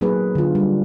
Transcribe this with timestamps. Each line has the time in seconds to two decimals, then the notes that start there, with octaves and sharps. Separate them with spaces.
0.01 F#3 A#3 D#4 G#4 B4
0.35 D3 F4
0.55 G3